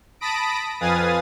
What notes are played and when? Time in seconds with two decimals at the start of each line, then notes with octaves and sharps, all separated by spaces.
0.21 A5 B5 D#6 A#6 B6 D7
0.81 F2 B4 F5 G#5 D#6 A6